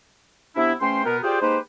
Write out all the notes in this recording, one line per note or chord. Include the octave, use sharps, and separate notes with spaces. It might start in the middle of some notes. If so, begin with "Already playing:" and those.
C3 B3 D4 E4
E2 A3 C#4 C5 G5 C6
B2 B3 A#4
F4 G4 G#4 C5 D5 G5
G#3 A#3 D#4 G4 B4 C5